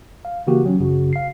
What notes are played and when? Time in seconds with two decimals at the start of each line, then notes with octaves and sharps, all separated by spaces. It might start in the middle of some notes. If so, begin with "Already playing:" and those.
0.25 F5
0.47 C#3 E3 A#3 F#4 G4
0.66 F#3 C#4
0.80 A1 F#2 C#3 F#4
1.13 F5 C7